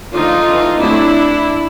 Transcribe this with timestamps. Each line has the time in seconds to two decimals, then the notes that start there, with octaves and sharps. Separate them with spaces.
0.15 D3 F3 A3 D#4 F4
0.48 E3 A3 D4
0.82 D3 F#3 A3 C4 D4 E4